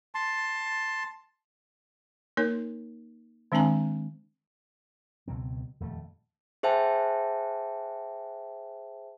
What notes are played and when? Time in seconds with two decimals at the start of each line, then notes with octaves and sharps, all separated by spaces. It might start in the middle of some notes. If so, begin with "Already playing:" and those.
0.15 A5 C6
2.37 A#3 D#4 A#4 C#5
3.52 D#3 G#3 C4 D4 G#5 A#5
5.28 C#2 B2 F#3 C4
5.80 D#1 F2 A3
6.63 G#4 C5 E5 G5 A5